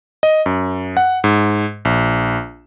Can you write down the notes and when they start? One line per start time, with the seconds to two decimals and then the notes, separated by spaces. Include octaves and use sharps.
0.23 D#5
0.46 F#2
0.97 F#5
1.24 G#2
1.85 A#1